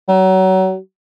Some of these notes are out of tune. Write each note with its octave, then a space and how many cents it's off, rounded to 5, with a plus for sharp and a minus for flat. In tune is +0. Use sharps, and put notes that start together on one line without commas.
F#3 +30